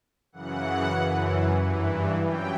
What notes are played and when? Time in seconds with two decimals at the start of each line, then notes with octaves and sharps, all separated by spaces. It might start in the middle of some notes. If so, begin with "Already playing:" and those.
0.32 F#2 C#3 E3 F#5
0.97 F#2 E3
1.61 G2 E3
2.24 F#2 E3 G5